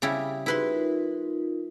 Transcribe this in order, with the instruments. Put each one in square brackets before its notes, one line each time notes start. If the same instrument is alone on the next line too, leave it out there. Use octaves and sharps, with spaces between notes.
[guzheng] C#3 G3 E4
[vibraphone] D#4 F#4 G#4 [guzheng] E4 B4 C6
[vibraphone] D#4 F4 A#4